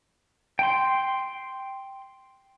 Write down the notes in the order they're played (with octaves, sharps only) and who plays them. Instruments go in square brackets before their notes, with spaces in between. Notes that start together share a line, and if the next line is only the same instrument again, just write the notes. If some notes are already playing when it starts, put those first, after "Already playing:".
[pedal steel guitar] G5 C6